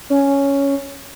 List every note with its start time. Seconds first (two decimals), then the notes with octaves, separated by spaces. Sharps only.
0.10 C#4